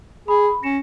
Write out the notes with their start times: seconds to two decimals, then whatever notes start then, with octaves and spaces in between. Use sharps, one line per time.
0.28 G#4 B5
0.63 C#4 A#6 C#7 E7